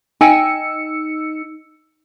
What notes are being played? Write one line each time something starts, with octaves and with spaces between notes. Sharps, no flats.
D#4 G5 G#5 E6 C#7